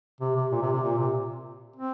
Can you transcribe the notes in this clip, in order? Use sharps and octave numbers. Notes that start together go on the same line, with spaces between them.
C3
C3
A#2
C3
C3
A#2
C3
C4